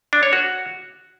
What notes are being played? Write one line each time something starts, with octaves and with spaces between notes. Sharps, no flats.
D4
C#5
F#4